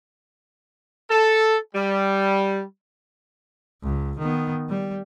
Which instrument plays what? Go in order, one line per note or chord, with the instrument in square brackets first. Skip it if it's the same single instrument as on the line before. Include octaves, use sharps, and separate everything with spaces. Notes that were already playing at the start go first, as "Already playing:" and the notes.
[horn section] A4
G3
[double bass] C#2
D#3 B3
G3